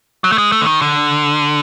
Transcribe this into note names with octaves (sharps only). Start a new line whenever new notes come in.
F#3
A3
G#3
A3
D3
D#3
D3